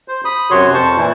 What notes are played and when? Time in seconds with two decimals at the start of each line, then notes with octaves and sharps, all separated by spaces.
0.08 C5
0.25 B5 D#6
0.51 F#2 C3 F#4 C#5 C6
0.74 F2 C5 A5 C#6
0.97 A#2 E3 E4